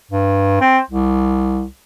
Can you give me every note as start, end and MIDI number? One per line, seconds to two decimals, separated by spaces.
0.11 0.59 43
0.61 0.79 60
0.90 1.64 36